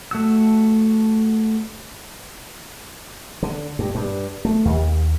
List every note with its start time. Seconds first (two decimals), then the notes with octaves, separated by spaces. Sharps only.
0.11 A3 F#4 E6
3.43 D3
3.79 G2
3.95 G2
4.45 A3
4.65 D#2